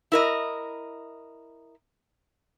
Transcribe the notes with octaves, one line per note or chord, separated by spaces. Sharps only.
E4 A#4 D#5